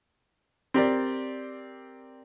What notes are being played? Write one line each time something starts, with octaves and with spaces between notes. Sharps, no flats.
C4 G4 A#4 D5